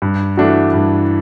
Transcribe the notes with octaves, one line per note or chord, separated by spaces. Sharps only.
G2
E3 A3 D4 F#4
G2